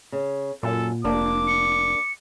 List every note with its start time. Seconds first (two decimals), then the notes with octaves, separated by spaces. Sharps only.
0.12 C#3
0.63 F#2 A#2 A4
1.04 F1 A#3 D4 D6
1.48 C#7